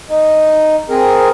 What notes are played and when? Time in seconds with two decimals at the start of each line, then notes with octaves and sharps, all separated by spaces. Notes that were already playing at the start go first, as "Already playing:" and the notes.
0.09 D#4
0.90 C4 G#4 A#4